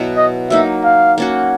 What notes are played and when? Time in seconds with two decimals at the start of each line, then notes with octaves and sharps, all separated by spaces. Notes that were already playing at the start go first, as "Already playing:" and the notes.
Already playing: B2 F#3 B3 E4
0.17 D#5
0.50 F#3 A#3 D#4 E5
0.84 F5
1.18 A#3 C#4 F#4